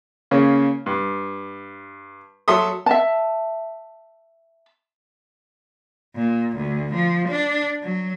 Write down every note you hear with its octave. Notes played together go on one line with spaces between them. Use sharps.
C#3 A#3 C#4
G2
F#3 A4 E5 C6 D#6
E5 A5
A#2
D2
F3
D4
F#3